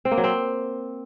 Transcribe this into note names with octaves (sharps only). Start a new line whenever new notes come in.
C4
A#3
F#3
C4